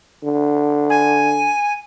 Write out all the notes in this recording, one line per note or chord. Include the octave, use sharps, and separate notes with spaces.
D3
G#5